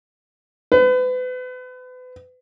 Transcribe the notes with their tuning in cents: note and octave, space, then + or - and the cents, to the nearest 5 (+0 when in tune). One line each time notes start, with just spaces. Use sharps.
B4 +35